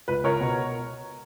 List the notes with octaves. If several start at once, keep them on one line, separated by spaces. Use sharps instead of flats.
C#2 B4
C#2 A#4 C#5
B2